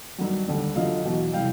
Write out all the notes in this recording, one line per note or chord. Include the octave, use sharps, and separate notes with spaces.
G2 D#3 F#3
D#2 D3 G3
F#2 D3 F3 D#5 F5
E2 B2 F#3
C3 E3 G3 F5 G5